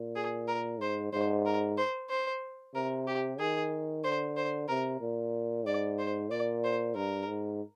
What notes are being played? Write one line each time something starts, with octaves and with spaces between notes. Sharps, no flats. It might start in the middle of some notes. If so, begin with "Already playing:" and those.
Already playing: A#2
G#4
A#4
G#2 C5
G#2 C5
A#4
C5
C5
C3 A#4
G4
D#3 G#4
D3 C5
C5
C3 A#4
A#2
G#2 D5
C5
A#2 D5
C5
G2 A#4
G#2